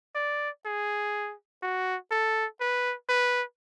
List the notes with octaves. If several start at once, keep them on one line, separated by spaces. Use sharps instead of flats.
D5
G#4
F#4
A4
B4
B4